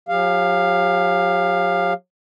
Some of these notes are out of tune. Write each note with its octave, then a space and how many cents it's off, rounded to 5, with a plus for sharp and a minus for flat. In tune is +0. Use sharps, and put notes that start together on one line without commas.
F#3 -35 G4 +40 F5 +0